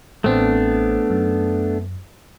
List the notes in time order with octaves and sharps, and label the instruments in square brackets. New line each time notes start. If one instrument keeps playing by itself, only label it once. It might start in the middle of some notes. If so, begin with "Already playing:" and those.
[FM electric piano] A1 C4 [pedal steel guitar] A3 B3 D4
[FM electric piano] F#2